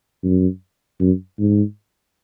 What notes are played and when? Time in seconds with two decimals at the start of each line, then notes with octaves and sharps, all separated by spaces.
0.24 F#2
1.00 F#2
1.39 G#2